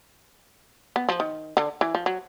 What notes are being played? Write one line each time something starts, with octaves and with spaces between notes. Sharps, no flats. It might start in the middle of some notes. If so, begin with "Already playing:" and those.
B3
F3
D#3
D3
E3
F3
F#3